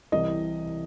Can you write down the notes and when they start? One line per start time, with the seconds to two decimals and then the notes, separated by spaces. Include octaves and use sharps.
0.12 C2 C3 E3 D#5